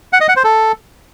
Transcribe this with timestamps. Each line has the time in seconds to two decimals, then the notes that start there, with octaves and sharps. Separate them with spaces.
0.13 F#5
0.21 D#5
0.28 F#5
0.36 C5
0.44 A4